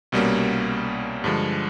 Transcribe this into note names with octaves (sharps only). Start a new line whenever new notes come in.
C2 B2 G3 A#3 C#4
G2 D3 F3 G#3